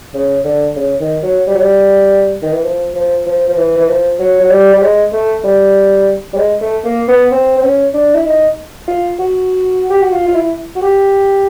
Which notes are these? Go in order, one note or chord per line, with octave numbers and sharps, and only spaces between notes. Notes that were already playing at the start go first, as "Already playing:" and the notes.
C#3
D3
C#3
D#3
F#3
G3
F#3
G3
D#3
E3
F3
F3
F3
F3
E3
E3
F3
F#3
F#3
G3
G3
G#3
A3
G3
G3
G#3
A3
A#3
B3
C4
C4
C#4
D4
E4
D#4
F4
F#4
G4
F#4
F4
F4
E4
F#4
G4